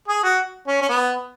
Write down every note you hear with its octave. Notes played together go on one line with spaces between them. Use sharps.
G#4
F#4
C#4
C#4
B3